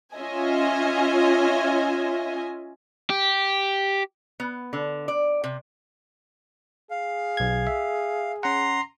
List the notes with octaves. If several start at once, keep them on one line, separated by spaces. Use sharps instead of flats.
C#4 F4 D#5 E5 G#5
G4
B3
D3
D5
C3
G#4 F5
B1 G#6
E5
C#4 F#5 A#5 C6